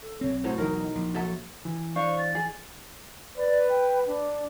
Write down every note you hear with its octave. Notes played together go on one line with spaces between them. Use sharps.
A4
B1 C4 C#5
A2 F#3 C5
E1 B1 D#4 A#4
A#1
F#3 A4 E5
E3
D4 C5 F5 C#6
A6
G#4
B4 D5
G5
D4